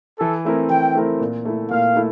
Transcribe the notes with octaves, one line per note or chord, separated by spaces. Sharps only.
E3 A4
A3 C4 E4 A#4
E3 G5
A3 C4 E4 A#4
A#2
A3 E4
A#2 F5
A3 E4